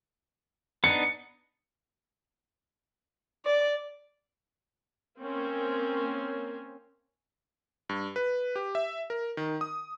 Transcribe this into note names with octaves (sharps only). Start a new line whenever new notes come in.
B3 D4 D#4 C#7
D5
A#3 C4 C#4
G2
B4
G4
E5
A#4
D#3
D#6